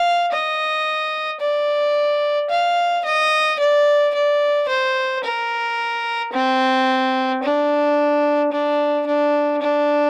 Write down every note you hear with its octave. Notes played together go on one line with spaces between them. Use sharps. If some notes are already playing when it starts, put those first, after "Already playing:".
Already playing: F5
D#5
D5
F5
D#5
D5
D5
C5
A#4
C4
D4
D4
D4
D4